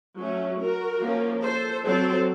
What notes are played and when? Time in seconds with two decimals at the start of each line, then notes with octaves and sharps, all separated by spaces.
0.20 F#3 A3 C#4
0.60 F#4 A#4
1.02 F3 A#3 C#4
1.44 A4 C5
1.85 F#3 C4 A4 C5